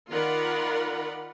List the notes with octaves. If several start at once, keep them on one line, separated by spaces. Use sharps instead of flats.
D#3 F4 A#4 D5 F#5 B5